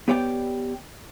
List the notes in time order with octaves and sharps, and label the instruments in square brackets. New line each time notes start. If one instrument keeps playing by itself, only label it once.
[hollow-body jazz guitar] B3 G4 C#5 D5 F#5 G5